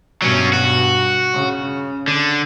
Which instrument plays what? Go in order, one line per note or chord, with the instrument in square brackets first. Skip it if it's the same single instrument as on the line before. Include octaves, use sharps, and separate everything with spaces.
[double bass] G2 B2 [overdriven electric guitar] F#3 C#4
[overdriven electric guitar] F#4
[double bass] C#3
[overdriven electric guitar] D3